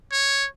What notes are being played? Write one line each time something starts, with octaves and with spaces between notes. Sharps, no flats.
C#5